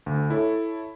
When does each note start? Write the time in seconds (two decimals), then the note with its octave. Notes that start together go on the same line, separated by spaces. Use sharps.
0.06 D2
0.30 E4 A4 C#5